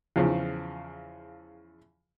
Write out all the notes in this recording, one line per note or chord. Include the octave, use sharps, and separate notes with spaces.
E2 C#3 F3